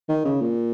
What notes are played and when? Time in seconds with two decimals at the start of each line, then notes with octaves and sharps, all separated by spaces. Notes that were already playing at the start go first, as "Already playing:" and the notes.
0.09 D#3
0.25 C#3
0.41 A#2